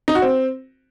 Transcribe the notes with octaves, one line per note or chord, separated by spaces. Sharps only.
D#4
F#4
C4